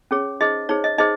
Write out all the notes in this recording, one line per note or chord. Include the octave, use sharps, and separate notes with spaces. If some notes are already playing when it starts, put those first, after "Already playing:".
C#4 G#4 C#5
D#4 G#4 C5 D#5
D#4 G#4 C5 C#5
D#5
D#4 G#4 C5 D#5